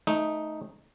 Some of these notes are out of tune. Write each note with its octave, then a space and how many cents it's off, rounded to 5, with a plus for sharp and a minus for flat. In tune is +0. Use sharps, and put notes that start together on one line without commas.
A3 -10 D#4 +0